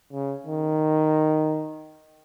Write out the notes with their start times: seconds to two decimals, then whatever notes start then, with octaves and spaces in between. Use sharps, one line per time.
0.12 C#3
0.46 D#3